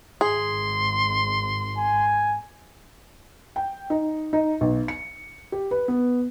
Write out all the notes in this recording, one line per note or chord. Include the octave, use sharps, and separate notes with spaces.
G#1 G#4 C6
G#5
G5
D#4
D#4
B1
C#7
G4
B4
B3